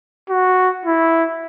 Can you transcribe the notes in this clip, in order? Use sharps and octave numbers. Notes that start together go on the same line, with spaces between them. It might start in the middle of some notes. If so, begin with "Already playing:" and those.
F#4
E4